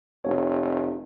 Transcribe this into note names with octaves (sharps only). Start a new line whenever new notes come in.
F1 C#5